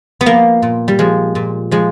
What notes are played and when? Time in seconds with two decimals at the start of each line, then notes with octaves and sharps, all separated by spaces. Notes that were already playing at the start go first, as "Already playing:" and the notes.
0.21 B3
0.26 F3 A#3
0.62 A#2
0.88 G3
0.99 F3 G#3
1.35 A#2
1.71 F3 G#3